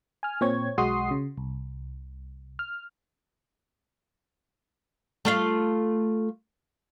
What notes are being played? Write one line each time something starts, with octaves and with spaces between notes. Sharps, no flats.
G#5 F6
A#2 C4 C#5 G#6
B1 G#3 F#4 C6 D#6 C7
C#3
C2
F6
A3 F4 F5